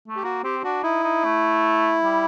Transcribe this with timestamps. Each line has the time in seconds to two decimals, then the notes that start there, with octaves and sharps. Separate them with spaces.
0.08 A3
0.16 G4
0.23 A#3 F#4
0.44 C4 G4
0.64 D4 F#4
0.83 D#4 E4
1.04 D#4
1.24 A3
2.04 G3